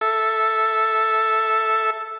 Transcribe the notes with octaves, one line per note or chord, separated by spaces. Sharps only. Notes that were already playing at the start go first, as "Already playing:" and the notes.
A4 E5